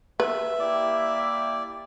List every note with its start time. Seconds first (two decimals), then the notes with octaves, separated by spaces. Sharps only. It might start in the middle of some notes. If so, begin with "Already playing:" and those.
0.20 B4 E5
0.60 A#3 E4 G4 D5